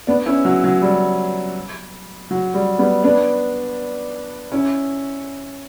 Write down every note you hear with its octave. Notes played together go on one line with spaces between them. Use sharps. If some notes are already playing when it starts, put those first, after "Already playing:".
B3 D4
C#4 E4
F#3
F#3
G3
F#3
G3
G3 B3
B3 D4
C#4 E4